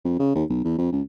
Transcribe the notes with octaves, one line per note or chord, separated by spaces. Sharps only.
F2
C#3
D#2
B1
E2
F2
C#2